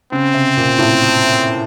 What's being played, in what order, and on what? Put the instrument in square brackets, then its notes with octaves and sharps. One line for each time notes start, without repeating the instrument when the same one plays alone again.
[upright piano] C#3 [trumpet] C4
[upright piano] C3
A#2
A2